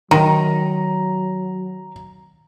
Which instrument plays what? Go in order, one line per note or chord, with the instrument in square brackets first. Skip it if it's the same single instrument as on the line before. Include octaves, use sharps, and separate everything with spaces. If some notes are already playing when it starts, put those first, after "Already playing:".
[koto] D#3 [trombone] F#3 [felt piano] A#5